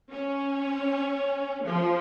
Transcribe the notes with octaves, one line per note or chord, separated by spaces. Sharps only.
C#4
F3